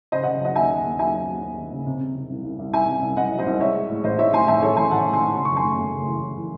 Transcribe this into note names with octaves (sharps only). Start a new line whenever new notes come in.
C#3 C5 D#5
D#5 F#5
C#3
F#3 D#5 F#5
D#2 E5 G#5
D#2
D#2
F#3 E5 G#5
F#3
D#2
D#2
D#2
C#3
C3
C3
C3
C2
C2
C2
C2 E5 G#5
C3
C2
C2 D#5 F#5
F#3
C5 D#5
C2
G#3 C#5 E5
G#3
A2
A1 C5 D#5
A2 C#5 E5
A2 G#5 C6
A1 E5 G#5
A1 A4 C#5
A1 G#5 C6
A1 F#5 A5
A1
G#5 C6
A2
C#3 C6
F#2 C#6
G#5 C6
A3
A3
C#3
E3
E3
E3